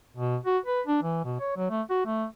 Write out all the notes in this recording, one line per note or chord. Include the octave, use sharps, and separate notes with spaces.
B2
F#4
B4
D4
E3
B2
C#5
F#3
A3
F#4
A3